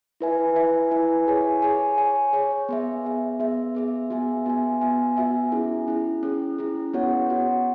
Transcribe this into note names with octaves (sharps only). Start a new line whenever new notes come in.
E4 B4 E5 G#5
E4 B4 E5 G#5
E4 B4 E5 G#5
G#4 C#5 G#5
G#4 C#5 G#5
G#4 C#5 G#5
G#4 C#5 G#5
B3 G#4 E5
B3 G#4 E5
B3 G#4 E5
B3 G#4 E5
B3 F#4 E5 G#5
B3 F#4 E5 G#5
B3 F#4 E5 G#5
B3 F#4 E5 G#5
C#4 E4 G#4
C#4 E4 G#4
C#4 E4 G#4
C#4 E4 G#4
B3 F#4 C#5 F#5
B3 F#4 C#5 F#5